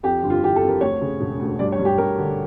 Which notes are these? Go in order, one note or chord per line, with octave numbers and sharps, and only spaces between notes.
F2 G4
G1
F4
E3 G4
A4
F2
A#4
D2 C#5
C#3
E1
D2
G2 D5
C#5
G2
G4
G2 A#4
D3